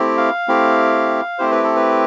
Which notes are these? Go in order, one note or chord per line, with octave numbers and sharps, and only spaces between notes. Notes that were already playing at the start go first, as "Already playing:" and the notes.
Already playing: A3 C4 E4 G4
F5
A3 C4 E4 G4
A3 C4 E4 G4 C5
B4
A4
B4